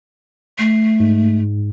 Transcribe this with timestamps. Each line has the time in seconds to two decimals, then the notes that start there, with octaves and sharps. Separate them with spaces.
0.59 A3 C7
1.00 G#2